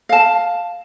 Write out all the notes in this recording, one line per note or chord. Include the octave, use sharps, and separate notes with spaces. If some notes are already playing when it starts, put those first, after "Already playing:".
F5 A5